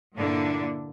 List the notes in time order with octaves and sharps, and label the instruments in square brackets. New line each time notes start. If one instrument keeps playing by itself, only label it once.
[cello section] G2 A#2 D3 A#3 D4 E4